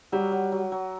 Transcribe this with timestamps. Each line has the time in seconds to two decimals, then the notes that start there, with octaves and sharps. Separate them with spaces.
0.12 F#3 G3
0.32 F#3
0.52 F#3
0.72 F#3